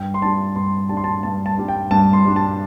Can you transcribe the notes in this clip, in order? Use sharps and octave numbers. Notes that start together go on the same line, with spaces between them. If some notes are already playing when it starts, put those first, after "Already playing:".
Already playing: G2 G5
C6
G3 D4 A5
G2 C6
G3 D4 A5
C6
A5
G2 A5
A5
G3 D4
G5
G2 A5
C6
G3 D4
A5